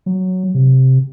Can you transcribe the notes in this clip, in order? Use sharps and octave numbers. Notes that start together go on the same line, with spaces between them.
F#3
C3